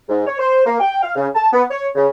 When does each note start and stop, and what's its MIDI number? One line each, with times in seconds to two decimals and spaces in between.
0.08 0.24 44
0.26 0.37 73
0.39 0.64 72
0.66 0.77 58
0.80 0.98 79
1.03 1.13 77
1.16 1.27 49
1.35 1.47 81
1.53 1.64 59
1.70 1.88 73
1.95 2.07 49